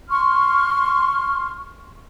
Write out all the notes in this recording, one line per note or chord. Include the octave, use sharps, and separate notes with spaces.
C6 C#6 F6